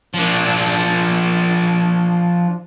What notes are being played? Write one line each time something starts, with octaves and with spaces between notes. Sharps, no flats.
F3 D4